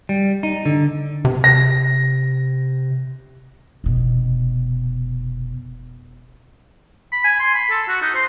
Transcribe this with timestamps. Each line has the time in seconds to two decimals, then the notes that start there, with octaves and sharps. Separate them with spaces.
0.09 G3
0.43 D#4
0.65 D3
1.25 C3
1.44 A#6
3.84 F1 B2
7.13 B5
7.24 G#5
7.40 C6
7.54 B5
7.70 A4
7.88 F#4
8.02 D#4
8.15 C5